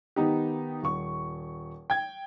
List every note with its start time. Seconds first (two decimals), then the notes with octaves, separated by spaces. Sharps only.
0.16 D#3 B3 D#4 G4
0.83 D#1 C#6
1.90 G5 G#6